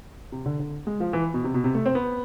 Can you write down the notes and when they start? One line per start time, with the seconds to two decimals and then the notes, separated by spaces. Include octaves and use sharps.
0.32 C3
0.46 D3
0.59 D3
0.87 G#3
1.00 F3
1.13 E3
1.34 B2
1.44 C3
1.54 B2
1.64 C3
1.74 A3
1.86 C4
1.95 B3